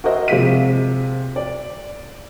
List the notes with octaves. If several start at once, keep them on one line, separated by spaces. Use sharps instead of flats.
F#4 A#4 C5 D#5 E5
C3 F3 G#3 B6 D#7
D5